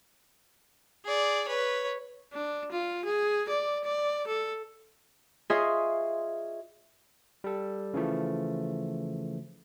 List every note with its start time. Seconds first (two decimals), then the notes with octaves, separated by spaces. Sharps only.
1.05 G#4 D5
1.48 B4 C#5
2.33 D4
2.72 F4
3.05 G#4
3.49 D5
3.85 D5
4.27 A4
5.50 F4 G#4 C#5 D#5 E5 C6
7.44 G3 A4
7.94 C#3 E3 F3 A3